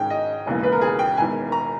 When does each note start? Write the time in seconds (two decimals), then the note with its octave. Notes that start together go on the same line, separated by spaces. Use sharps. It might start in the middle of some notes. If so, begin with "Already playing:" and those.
Already playing: G#2 D#3 G#3 C#4 G5
0.10 D#5
0.46 E1 D#2 C#3 E3
0.63 B4
0.72 A#4
0.81 G#4
0.99 G5
1.17 E1 E2 D#3 G#5
1.52 A#5